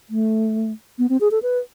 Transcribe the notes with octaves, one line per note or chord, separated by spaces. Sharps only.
A3
B3
C4
G#4
A4
B4